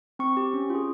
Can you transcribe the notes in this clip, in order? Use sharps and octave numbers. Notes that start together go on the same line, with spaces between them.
C4 C#6
G4
C#4
F4 G#4